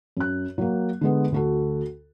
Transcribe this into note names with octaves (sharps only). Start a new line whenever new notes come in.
F#2 F#6
F#3 A#3
D3 G#3 B3
D2 F#4 A4